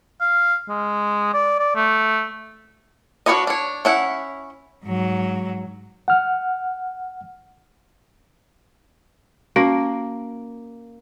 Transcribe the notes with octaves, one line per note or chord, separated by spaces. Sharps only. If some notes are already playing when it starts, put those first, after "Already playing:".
F5
G#3
D5
D5
A3
D4 F#4 B4 C#5 D#5
D4 C#5
C#4 E4 F#5
G#2 F#3
F#5 F6
A#3 C#4 F#4